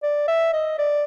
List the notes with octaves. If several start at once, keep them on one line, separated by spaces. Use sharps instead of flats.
D5
E5
D#5
D5